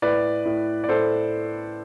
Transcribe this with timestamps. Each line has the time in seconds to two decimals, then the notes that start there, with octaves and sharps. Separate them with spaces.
0.02 A2 B4 D5
0.45 A2
0.84 D5
0.89 A2 A4 C5